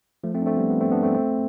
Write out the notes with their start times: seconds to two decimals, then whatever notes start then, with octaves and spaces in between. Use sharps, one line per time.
0.24 F3 A3
0.34 A3 C4
0.42 D4
0.46 A3 C4
0.57 G3 B3
0.69 G3 B3
0.81 A3 C4
0.92 B3 D4
1.03 A3 C4
1.15 A3 C4